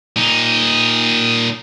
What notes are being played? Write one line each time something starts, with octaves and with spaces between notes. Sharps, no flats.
A#2 D#4